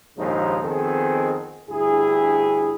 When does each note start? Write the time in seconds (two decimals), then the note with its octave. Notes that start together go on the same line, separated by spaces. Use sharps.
0.17 A#1 D#2 G#2 C#3 F3 D#4
0.63 F2 D#3 B3 C4 G#4 A4
1.70 D2 G2 E4 G#4